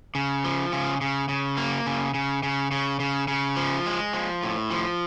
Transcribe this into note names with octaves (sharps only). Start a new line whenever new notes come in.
C#3
F3
C#3
C#3
C#3
A#3
C#3
C#3
C#3
C#3
C#3
C#3
F3
G#3
F3
A2
F3